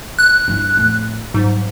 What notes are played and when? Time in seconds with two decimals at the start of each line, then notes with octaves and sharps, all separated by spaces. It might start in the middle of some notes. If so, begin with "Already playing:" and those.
0.19 F#6
0.48 G2 E4
0.77 F2 A2
1.34 G#2 F#3 G3